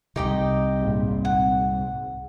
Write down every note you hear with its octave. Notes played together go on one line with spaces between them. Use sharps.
C2 C3 D#4 G4 D#5
G#1 A#2
G#1 G#2 F#5